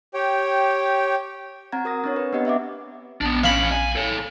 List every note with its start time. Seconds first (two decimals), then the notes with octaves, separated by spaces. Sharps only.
0.14 G4 C#5 G5
1.72 C4 F#5 A#5 G#6
1.84 F#4 A#4 D#6 A#6
2.04 C4 D4 C#5
2.16 B4
2.33 B3 C4 D4 G4 D#5 F#5
2.45 D#5 E5 F#5 D6
3.21 A#1 B3 D4
3.43 E3 C#4 F5 B5
3.72 G#5
3.96 A4 C#5